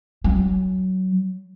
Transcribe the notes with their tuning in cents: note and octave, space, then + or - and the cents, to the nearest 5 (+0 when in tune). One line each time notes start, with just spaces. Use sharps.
F#3 +15